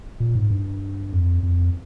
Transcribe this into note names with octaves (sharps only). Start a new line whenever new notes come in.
A#2
G#2
G2
F2
F2